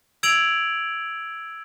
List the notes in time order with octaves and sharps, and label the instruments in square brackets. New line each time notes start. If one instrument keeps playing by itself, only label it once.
[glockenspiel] E6 G#6 D7 F7 F#7